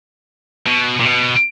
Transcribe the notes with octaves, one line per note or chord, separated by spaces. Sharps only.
B2
A#2
B2